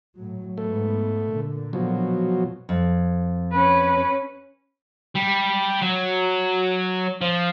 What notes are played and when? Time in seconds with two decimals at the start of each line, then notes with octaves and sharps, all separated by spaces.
0.17 A2 F#3
0.58 G#2 A3 B3
1.29 A#2 D3
1.73 B2 F3 F#3
2.69 F2
3.52 C#4 B4
5.15 G3
5.82 F#3
7.22 F3